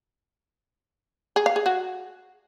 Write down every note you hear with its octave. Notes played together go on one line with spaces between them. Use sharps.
G#4
F5
G#4
F#4